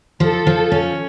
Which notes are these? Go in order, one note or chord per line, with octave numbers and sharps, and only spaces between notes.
F3 A4
F3
C#4